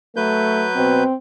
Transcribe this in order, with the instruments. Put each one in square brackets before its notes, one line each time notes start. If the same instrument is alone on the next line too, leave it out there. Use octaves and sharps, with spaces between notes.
[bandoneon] F#3 B4 G6 [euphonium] A3
[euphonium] B2 [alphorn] C4